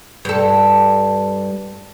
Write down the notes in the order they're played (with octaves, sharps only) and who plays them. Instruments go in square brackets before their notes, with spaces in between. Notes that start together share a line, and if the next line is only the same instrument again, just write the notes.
[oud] G2 A4